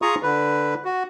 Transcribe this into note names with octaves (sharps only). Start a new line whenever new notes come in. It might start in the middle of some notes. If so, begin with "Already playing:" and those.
F4 G#4 A#5 C#6 D#6
D3 B4
F#4